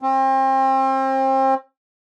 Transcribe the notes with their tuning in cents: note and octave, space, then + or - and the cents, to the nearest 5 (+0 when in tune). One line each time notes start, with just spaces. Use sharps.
C4 +35